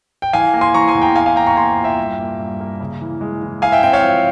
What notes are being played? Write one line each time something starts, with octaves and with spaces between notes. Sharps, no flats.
G5
E3 F5 G#5
A#3
G#5 C6
E3 A#5 C#6
G#5 C6
E2
G5 A#5
E4 F5 G#5
F5 G#5
A#3 G5 A#5
A#5 C#6
A#3 G#5 C6
A#2
E5 G5
G2
A#3
G2
A#3
C#3
E3
G#3
E3
E4 F5 G#5
E5 G5
C4 E5 G5
C#5 F5
F3